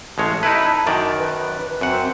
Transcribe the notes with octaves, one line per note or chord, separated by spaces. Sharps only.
A1 G#3 C#5 A5
D#4 E4 B4
F#2 D#3 D5
B4
F#2 C4 F#5